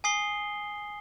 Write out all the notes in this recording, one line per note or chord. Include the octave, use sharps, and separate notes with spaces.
G#5 D#6 C7 G7